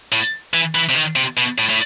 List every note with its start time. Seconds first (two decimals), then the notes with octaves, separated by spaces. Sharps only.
0.12 A2
0.54 E3
0.75 E3
0.89 C3
0.95 D#3
1.16 C3
1.37 B2
1.58 A2
1.69 A2